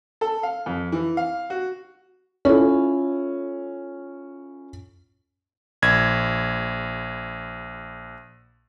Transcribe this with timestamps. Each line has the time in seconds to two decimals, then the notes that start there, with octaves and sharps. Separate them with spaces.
0.21 A4
0.43 F5
0.66 F2
0.92 E3
1.17 F5
1.50 F#4
2.45 C#4 E4 F4 A4
5.82 A#1 G#6